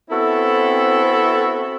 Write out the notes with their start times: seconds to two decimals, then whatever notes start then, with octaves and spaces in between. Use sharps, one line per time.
0.10 B3 C4 E4 F#4 A4